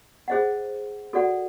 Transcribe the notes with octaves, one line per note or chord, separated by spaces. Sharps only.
G#4 C5 D#5 F#5
F#4 A4 D5 F#5